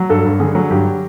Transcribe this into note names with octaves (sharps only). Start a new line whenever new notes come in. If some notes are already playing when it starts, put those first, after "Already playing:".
Already playing: F#3
G2 A4
G2
D3 G#4
F#3
G2 G4